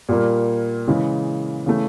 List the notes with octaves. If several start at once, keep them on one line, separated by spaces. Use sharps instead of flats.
A#2 G3 A#3
C#3 E3 G#3
C#3 E3 A3